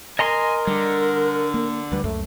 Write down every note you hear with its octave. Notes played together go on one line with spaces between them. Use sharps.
A#4 D#5 G#5 A#5 C6
D3 G3
A#3
D2 G3 B4
C#2 F#2 A3